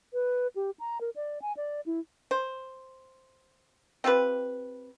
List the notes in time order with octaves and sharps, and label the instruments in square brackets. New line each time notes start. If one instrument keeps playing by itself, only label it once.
[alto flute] B4
G4
A#5
A#4
D5
G#5
D5
E4
[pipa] C5
C4 F4 G4 B4